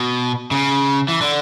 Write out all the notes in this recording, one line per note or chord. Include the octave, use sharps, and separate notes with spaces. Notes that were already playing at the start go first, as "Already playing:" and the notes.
Already playing: B2
C#3
E3
D3